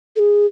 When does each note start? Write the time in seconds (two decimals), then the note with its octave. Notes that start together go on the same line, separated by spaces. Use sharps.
0.16 A4
0.19 G#4